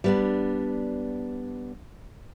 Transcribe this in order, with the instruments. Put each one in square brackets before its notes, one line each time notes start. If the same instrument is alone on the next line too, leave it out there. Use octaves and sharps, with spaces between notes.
[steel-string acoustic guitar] G3 B3 D4